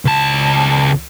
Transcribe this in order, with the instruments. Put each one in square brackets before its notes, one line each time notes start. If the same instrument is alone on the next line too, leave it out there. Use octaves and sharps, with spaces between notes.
[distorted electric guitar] C#2 A5